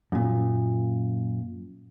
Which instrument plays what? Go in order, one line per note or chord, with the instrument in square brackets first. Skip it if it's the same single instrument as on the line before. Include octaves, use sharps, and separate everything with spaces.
[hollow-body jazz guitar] F#2 A#2